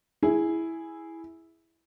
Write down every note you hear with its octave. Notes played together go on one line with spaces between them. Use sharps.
E4 G#4